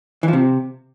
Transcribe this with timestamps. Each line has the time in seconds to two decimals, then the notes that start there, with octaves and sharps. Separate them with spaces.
0.23 E3
0.28 F3
0.33 C3